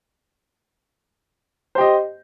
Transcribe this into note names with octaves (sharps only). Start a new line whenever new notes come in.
G4 C5 D#5